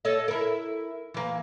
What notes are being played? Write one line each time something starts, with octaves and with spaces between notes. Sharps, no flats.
A4 C#5 D#5
E4 A#4
E3 A#3